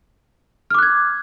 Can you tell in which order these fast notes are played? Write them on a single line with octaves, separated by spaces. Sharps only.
F6 D6 F#6 G#6